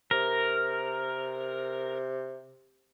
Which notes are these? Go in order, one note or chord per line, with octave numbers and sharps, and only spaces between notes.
C3 A#4